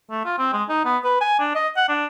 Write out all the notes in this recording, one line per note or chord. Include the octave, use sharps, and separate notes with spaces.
A3
F4
C4
G#3
D#4
B3
B4
G#5
D4
D#5
F#5
D4